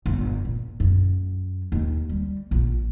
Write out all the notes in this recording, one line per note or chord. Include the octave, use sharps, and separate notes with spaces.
G1
A#2
F#2
D#2
G3
A#1